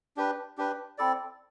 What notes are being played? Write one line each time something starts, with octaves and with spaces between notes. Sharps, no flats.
D4 G4 B4
D4 G4 B4
C4 E4 A4 D5